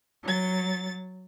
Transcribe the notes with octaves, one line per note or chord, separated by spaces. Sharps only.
F#3 A6